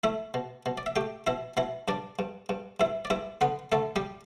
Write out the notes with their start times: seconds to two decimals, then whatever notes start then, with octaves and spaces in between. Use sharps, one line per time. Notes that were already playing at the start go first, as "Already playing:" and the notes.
0.04 A3 E4 E5
0.34 B2
0.66 B2
0.78 D5
0.86 E5
0.96 A3 G4 G5
1.27 B2 E4 E5
1.57 B2 E4 E5
1.88 G2 D4 D5
2.19 G2
2.49 G2
2.80 G2 E4 E5
3.05 D5
3.10 G2 E4 E5
3.41 D3 B3 B4
3.72 D3 A3 A4
3.96 G3 G4